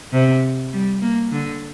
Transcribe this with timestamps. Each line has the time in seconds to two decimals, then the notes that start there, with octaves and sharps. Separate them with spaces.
0.13 C3
0.73 G3
1.02 A#3
1.31 D3